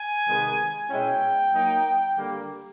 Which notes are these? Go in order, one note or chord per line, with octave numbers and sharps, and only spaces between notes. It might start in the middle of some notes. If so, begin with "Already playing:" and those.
Already playing: G#5
C3 D#3 G#3 B3 D#4
B2 G#3 C#4 E4 G5
F#3 A#3 D#4
D3 G3 A#3